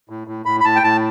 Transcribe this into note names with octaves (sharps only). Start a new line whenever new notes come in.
A2
A2
A2 B5
B5
A2 A5
G5
A2 A5